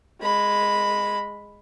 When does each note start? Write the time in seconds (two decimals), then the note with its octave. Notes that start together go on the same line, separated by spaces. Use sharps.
0.21 G#3 B5